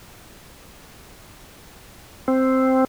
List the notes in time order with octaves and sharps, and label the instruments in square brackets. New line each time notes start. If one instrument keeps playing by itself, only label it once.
[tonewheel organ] C4